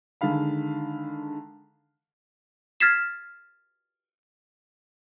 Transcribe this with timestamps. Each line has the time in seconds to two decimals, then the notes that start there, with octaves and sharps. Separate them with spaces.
0.21 D3 D#3 G#3 F5 B5
2.80 F6 G#6 A6 B6 C7 E7